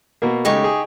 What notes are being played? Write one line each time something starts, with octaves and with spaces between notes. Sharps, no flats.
B2 A#3
C#3 G#3 A3 D#4 G4 C#6
G#4